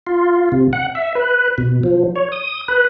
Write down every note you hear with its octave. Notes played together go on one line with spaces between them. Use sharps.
F4
C3
F#5
E5
B4
B2
F3
C#5
D#6
B4